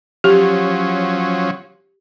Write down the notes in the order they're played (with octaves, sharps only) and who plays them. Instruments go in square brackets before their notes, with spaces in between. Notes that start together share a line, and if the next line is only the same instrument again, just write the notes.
[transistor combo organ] F3 F#3 C#4 [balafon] G4